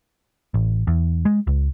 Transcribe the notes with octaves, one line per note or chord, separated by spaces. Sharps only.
A1
E2
G#3
C#2